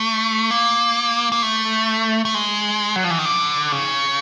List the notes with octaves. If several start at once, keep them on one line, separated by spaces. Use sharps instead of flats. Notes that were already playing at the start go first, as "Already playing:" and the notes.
Already playing: A3
A#3
A#3
A3
A3
G#3
F#3
F3
E3
D#3
D3
C#3